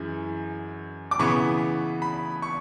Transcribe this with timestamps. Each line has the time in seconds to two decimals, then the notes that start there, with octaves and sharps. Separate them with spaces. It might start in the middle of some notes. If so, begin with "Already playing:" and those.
Already playing: F#2 E3 G#3
1.11 D6
1.19 C#3 E3 B3 C#6
2.02 B5
2.42 C#6